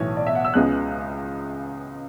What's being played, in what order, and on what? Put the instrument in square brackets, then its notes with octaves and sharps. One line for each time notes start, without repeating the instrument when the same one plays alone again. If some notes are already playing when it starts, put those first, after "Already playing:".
Already playing: [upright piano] B1 A2 E3 C#5
D5
E5
F#5
E6
C#2 C#3 G#3 B3 F#6